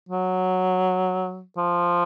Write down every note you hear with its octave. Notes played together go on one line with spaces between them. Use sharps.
F#3
F3